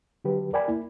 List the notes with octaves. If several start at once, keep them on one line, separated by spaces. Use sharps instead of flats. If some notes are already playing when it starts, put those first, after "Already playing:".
D3 F#3 G4 B4
A#4 D5 G5 G#5 B5
A#3 E4